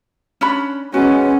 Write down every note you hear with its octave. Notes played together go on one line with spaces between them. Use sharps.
C#4 D4 B5
G#3 B3 C#4 F#4